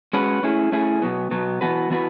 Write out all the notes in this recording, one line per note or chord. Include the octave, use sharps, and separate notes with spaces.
G#3 C#4 F#4 B4
A3 C#4 E4 G#4
A3 C#4 E4 G#4
B2 F#3 B3
B2 F#3 B3
E3 B3 F#4 B4
E3 B3 F#4 B4